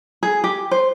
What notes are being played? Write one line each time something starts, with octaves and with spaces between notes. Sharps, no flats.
G#4
G4
C5